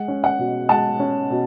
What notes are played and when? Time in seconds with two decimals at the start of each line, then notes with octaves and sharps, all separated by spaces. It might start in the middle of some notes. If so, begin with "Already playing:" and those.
Already playing: G#3 F#5
0.08 C#4
0.24 F#5
0.39 B2
0.69 G#3 F#5 A5
1.00 C#4
1.30 B2